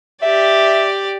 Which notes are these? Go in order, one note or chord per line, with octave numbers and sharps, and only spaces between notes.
G4 D5 E5